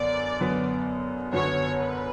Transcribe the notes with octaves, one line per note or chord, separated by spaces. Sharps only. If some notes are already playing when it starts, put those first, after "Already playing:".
Already playing: F#2 D3 F#3 B3 D5
F#2 D3 F#3 B3
F#2 D3 F#3 B3 C#5
B4